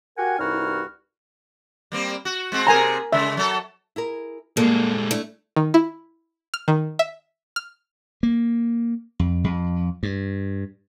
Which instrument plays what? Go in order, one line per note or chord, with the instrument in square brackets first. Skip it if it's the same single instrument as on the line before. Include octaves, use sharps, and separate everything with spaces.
[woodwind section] F#4 G4 A#4 F#5 G#5
C2 G2 D#4 E4 F#4 F6
[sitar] G3 A#3 C4
F#4
G#3 C4 F#4
[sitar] C3 G#4 C5 [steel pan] A#4 G#5 A#5
[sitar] C#3 G#3 [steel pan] E5
[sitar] F#3 A4
[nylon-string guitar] E4 G#4 A#4
[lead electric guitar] A#2 G#3 [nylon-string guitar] G3 G#4 A4 [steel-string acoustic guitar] A#3
[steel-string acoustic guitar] A3 [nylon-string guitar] D4 E4
[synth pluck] D#3
E4
F6
D#3
E5
F6
[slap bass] A#3
F2
F2
G2